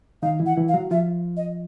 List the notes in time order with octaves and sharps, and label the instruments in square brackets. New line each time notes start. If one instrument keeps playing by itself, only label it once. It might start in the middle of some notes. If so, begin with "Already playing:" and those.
[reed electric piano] D#3 D#4 [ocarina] F5
[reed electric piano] E3 E4
[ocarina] F#5
[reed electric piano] E3 E4
[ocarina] F5
[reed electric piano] F#3 F#4
[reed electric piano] F3 F4 [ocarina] E5
[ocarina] D#5